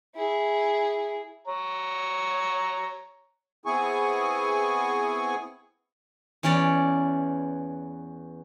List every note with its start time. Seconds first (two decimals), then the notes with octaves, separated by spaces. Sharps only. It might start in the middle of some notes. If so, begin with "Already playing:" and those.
0.15 E4 G#4
1.47 C#5 A#5
3.66 B3 C4 E4 G#4 G#5 C#6
6.43 E2 E3 C#4 C#5 D5